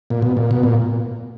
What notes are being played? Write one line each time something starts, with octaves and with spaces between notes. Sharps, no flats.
A#2
B2
A#2
B2
A#2